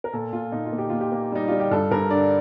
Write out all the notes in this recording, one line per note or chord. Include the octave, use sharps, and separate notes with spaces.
A#4
A#2 A4
A#2 F4
A#2 D#4
F4
A#3
G4
A#2 F4
G4
A#3
G3 D#4
G3 F4
G4
G2 A4
G2 A#4
D3 D5